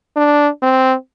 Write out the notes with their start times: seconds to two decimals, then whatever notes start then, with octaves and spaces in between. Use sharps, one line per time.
0.16 D4
0.62 C4